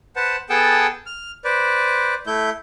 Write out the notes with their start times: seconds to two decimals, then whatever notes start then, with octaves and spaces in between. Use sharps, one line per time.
0.16 B4 C5 F#5 A5
0.50 B3 G#4 A4 F#5 G5 A5
1.06 F6
1.45 B4 C5 D5
2.27 A3 E4 G6